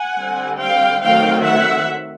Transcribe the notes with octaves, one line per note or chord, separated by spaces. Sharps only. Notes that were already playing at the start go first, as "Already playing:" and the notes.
Already playing: F#5 G#5
D3 G3 C4
F5 G5
D#3 F#3 A3 C4 F5 G5
E5 F#5